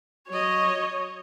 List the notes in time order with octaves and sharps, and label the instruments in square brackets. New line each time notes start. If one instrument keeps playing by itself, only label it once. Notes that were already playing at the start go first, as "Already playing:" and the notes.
[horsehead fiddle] F#3 D#5 [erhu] C#5